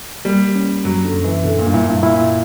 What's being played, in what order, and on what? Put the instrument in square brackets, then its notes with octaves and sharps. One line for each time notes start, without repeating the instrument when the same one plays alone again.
[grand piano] G3 [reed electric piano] A#3
[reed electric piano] C#4
[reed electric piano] F#2 [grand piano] F#3
[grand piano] D3
[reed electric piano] F#2
[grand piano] E3
[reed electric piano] B2 [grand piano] D3
[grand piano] A#2
G2
[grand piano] A#2 [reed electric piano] E4
[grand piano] G2
[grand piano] A#2 [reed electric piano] E4